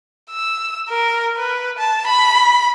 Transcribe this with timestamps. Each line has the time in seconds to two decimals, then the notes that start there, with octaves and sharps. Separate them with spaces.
0.31 E6
0.89 A#4
1.36 B4
1.78 A5
2.07 B5